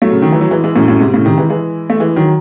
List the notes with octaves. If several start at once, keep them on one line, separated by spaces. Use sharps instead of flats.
F#3 A3
C#3
D#3
E3
F#3
E3 G#3
E3 G#3
F#2 A2
F#2 A2
G#2 C3
A2 C#3
C3 D#3
E3 G#3
E3 G#3
A3
E3 G#3
D#3 F#3